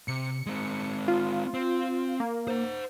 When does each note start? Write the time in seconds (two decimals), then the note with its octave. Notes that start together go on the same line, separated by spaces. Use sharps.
0.08 C3 C#7
0.46 G#3 C4
1.08 F4
1.54 C4
2.20 A#3
2.48 C5 F#5